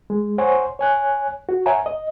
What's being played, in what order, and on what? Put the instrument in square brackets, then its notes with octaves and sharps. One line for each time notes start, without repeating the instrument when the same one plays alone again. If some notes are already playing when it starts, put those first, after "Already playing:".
[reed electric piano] G#3
C5 C#5 F#5 G#5 C6 C#6
C#5 G#5 F#6
F#4
C#5 E5 F#5 G#5 A#5
D#5